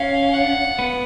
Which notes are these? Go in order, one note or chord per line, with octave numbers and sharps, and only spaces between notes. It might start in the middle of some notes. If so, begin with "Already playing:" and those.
Already playing: C#4 F5
F#5
B3